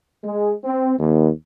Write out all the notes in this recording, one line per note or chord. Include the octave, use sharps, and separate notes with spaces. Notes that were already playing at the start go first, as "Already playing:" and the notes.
G#3
C4
D#2